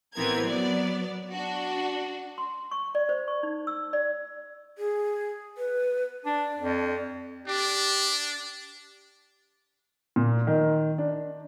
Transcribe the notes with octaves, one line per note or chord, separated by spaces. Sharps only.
A1 E3 B3 C4 A#4 G#6
F#3 B3 D5
D4 F#4
C6
C#6
D5
C5
C#6
D#4
E6
D5
G#4
B4
D4 D5
F2
D4 G4
A#2
D#3
D4